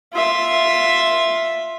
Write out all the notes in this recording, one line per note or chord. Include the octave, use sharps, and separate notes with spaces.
F4 E5